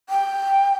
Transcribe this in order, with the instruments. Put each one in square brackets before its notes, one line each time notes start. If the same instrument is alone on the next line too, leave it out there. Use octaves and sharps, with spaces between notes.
[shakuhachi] G5